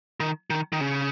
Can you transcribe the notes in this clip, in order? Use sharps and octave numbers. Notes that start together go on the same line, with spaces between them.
D#3
D#3
D#3
C#3